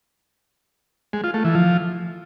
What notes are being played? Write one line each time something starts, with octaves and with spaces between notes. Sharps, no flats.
G#3
F4
A3
E3
F3